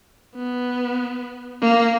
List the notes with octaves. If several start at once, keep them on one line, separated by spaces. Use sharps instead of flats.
B3
A#3